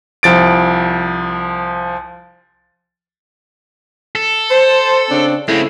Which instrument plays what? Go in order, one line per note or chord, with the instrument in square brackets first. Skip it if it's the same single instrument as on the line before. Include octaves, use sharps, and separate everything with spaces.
[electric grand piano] C2 F3 A6 D7
[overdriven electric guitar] A4
[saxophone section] C5
C#3 C4 D4
[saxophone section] C#3 A3 E4 [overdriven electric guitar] G#3 C4